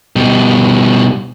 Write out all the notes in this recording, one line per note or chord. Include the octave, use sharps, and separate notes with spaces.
B2 G3